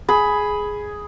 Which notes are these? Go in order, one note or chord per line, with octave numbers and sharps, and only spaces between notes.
G#4 B5